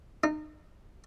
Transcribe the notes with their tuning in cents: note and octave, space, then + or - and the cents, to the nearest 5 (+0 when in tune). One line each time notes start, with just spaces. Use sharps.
D#4 -30